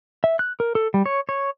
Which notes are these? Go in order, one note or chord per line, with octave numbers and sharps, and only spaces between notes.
E5
F#6
A#4
A4
G3
C#5
C#5